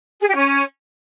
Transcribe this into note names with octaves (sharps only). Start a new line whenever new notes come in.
G#4
G4
C#4